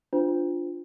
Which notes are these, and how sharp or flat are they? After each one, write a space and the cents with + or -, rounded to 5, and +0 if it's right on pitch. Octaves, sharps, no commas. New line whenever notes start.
D4 +0 F4 +0 C5 -30